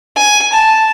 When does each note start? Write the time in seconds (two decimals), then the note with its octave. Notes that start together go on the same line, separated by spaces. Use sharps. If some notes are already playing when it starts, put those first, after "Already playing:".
0.16 G#5
0.53 A5